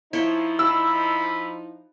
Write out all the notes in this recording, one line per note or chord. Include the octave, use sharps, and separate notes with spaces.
F3 D#4 E4 C#5 G5
B5 E6